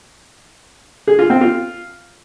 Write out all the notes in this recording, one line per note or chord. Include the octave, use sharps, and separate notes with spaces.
G#4
F4
C4
F4